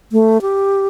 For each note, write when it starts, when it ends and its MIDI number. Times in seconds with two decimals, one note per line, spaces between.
0.12 0.41 57
0.41 0.88 67